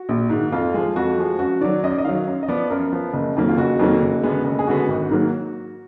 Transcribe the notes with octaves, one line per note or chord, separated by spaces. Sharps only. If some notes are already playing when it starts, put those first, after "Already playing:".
Already playing: F#4
A#1
G#2 D#3
F2 F4
F3 G#3
F2 F#4
F3 G#3
F#2 F#4
D#3 F#3 D5
F#2 D#5
D5
D#5
D#3 F#3 F5
F#2
D#5
F3 B3 D5
F#2 A#4
F3 B3
F#1
F2 D#3 F#3 A#3
F4
F#1 F#4
F2 D#3 F#3 A#3
F#1
F#2 D3 G#3 B3
F#1
G#4
F#2 D3 G#3 B3 F#4
G#1
G#2 D#3 F#3 A#3